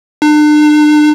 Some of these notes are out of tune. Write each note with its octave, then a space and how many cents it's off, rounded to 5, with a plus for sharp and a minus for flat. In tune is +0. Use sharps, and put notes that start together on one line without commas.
D4 +40